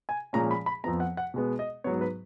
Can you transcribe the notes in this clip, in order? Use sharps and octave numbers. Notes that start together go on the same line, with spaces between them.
G#5
A#2 F3 G#3 C#4 A#5
B5
B5
F2 F3 B3 A#5
F#5
F#5
B2 G#3 B3
D#5
G#2 F#3 B3 C#5
B4